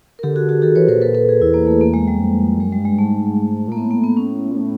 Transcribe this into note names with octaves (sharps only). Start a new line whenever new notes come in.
A#4
D3 G4 A4
F#4 G#4
F#4 G#4
D#3 G4 A4
E3 B4 C#5
A#2 A#4 C5
A4 B4
A4 B4
G#4 A#4
E2 E4
A#3
A3
A#3
G#3
G3
F2
F#2 G#3
G3
G2
G#3
G#2 A3
A#2 A#3
A2 B3
A#3
B3
C#4
A#2
A2